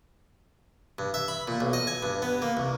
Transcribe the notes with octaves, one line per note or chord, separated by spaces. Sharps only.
G2
E5
B5
A#2
B1
D#5
G#5
G2
B3
A#3
C2